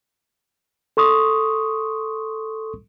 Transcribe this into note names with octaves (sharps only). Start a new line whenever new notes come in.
A4 C6 C#6 D#6